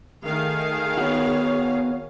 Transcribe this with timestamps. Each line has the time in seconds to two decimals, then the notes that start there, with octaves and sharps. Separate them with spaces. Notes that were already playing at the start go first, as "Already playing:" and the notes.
0.24 D#3 A3 G#4 F5
0.98 B3 F#4 C#5